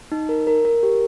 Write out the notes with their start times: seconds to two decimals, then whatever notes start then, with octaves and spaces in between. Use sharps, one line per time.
0.12 D#4
0.29 A#4
0.47 A#4
0.65 A#4
0.83 G4